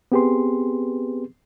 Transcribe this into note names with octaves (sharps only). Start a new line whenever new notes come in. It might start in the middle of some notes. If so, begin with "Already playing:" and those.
B3 C4 G4 G#4 B4 C6